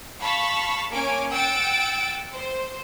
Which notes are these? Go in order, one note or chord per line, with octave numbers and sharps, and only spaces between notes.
F5 A5 B5 C#6 B6
A#3 C#4 C#5 G#5 D6 D7
F#5 G5 E6 A6 C#7 D7
C5